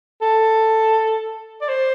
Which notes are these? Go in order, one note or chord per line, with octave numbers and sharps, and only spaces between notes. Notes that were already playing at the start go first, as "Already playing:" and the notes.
A4
D5
C5